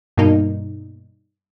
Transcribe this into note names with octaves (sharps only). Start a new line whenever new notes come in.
G2 B2 A#3 D#4